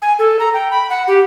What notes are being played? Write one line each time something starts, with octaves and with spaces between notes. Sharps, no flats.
G#5
A4
A#5
G5
B5
F#5
G4